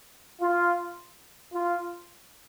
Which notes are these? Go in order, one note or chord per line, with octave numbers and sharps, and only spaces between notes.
F4
F4